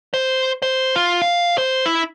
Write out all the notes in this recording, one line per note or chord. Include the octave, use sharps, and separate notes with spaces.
C5
C5
F4
F5
C5
E4